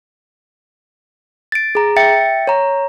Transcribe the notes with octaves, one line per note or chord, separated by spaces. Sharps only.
A6 D7
G#4 A#5
E5 G5 A6 C#7
C#5 A#5